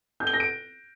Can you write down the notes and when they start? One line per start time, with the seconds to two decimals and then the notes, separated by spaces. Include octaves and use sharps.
0.20 G6
0.27 G7
0.33 A#6
0.40 D7